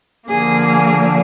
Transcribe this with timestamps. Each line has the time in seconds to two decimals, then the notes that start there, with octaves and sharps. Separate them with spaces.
0.28 D3 F3 A#3 G#4